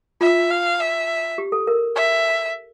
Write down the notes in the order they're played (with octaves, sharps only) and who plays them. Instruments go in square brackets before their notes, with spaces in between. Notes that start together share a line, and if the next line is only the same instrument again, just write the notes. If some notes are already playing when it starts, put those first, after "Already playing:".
[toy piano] F4 [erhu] E5
[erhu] F5
E5
[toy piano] G4
A4
A#4
[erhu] E5